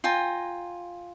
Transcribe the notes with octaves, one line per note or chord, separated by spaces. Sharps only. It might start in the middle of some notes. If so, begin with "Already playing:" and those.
F4 G5 G#5 A#5